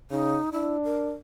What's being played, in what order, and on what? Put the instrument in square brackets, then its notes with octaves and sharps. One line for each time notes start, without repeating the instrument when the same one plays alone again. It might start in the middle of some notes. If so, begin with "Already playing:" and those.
[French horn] C#3 [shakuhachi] D#4
[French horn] D4 [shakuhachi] E4
[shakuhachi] A#4